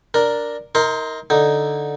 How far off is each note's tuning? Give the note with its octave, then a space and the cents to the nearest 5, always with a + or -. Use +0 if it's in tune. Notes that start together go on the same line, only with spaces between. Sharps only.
D4 +0 A#4 +0
D#4 +35 A#4 -5 C6 +0
D3 +0 D#4 +0